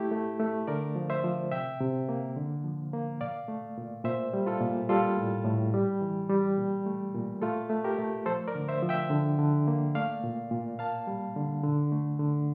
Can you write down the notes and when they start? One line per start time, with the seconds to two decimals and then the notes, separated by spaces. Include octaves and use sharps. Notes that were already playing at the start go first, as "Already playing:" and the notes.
Already playing: A3 E4 G4
0.11 A3
0.39 A3
0.67 D3 A#4 D5
0.95 F3
1.10 C5 E5
1.24 F3
1.51 C3 E5 G5
1.81 C3
2.09 A#3
2.36 D3
2.64 F3
2.93 A#3
3.21 A#2 D5 F5
3.48 A3
3.77 A#2
4.05 A#2 C5 E5
4.34 G3
4.46 F4 A4
4.61 A#2
4.89 G3 F4 A4
5.17 A2
5.45 A2
5.74 G3
6.01 E3
6.29 G3
6.58 A#2
6.86 A3
7.14 A#2
7.42 A3 F4 A4
7.70 A3
7.84 G4 A#4
7.98 A3
8.26 F3 A4 C5
8.48 A#4 D5
8.55 D3
8.68 C5 E5
8.82 F3
8.89 E5 G5
9.10 D3
9.39 D3
9.67 A#3
9.95 A3 D5 F5
10.24 A#2
10.51 A#2
10.79 A#3 F5 A5
11.07 G3
11.36 D3
11.63 D3
11.92 A3
12.19 D3